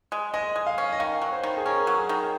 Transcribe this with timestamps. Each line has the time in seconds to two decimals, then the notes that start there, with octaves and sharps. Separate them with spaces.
0.12 G#3
0.34 G#3 D#5
0.56 G#3
0.66 F5
0.78 C#4
0.92 D#5
1.00 D#3 F5
1.22 F#3
1.33 C5
1.43 D#3
1.57 G#4
1.66 C#4 A#4
1.87 F#3
1.98 G#4
2.09 D#3